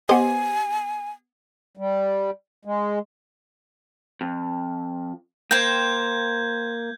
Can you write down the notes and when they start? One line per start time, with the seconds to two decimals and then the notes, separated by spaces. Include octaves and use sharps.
0.09 B3 G4 C5 D#5 G#5
1.77 G3
2.65 G#3
4.21 F2
5.51 A#3 C5 G5 G6 G#6